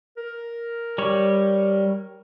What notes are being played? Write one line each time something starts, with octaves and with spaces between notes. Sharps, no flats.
A#4
G3 C#5